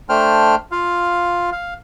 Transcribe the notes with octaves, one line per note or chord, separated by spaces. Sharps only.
A3 D4 C5 G5 F6
F4 F5
F5